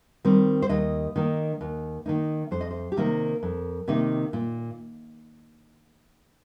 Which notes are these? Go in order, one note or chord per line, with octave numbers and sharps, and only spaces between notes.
D#3 G3 C4
C5
D#2 D#5
D#3 A#3 D#4
D#2
D#3 A#3 D#4
F2 C5
D#5
C5
G4
C3 D#3 A#3 D#4 A#4
F2
C3 D#3 A#3 D#4
A#2